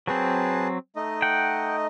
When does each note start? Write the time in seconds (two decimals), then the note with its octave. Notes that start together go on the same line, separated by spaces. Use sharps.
0.07 F#3 C4 G#4 B4 A5
0.96 A3 D#4 D#5
1.22 F#5 G5